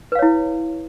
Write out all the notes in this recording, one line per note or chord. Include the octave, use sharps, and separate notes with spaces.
E4 B4 C#5 F5